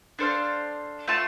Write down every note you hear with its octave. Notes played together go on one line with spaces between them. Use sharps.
D4 A4 C5 F5
A3 F4 C5 A5